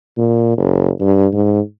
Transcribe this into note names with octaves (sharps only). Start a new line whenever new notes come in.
A#2
F#1
G2
G#2